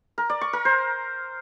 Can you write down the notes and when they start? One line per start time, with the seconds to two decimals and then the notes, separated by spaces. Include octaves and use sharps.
0.18 A#4
0.30 D5
0.41 C#6
0.53 A#4
0.65 C5